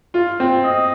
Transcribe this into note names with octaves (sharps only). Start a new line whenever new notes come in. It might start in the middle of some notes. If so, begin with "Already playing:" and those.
F4
C4
D#5